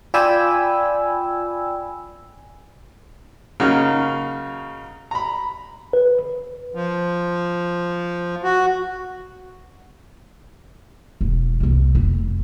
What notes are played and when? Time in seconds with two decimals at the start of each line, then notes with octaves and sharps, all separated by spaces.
0.14 F4 D5 G5 G#5 B5 E6
3.60 C#3 F#3 A#3 D#4
5.11 A#5 B5
5.93 B4
6.75 F3
8.43 F#4
11.21 E1
11.60 C2 C3
11.95 F1